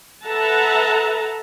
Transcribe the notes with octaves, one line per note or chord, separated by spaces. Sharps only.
A4 B4 E5 F#5 A5 A#5